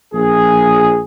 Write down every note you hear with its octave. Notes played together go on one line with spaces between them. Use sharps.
A#1 G#4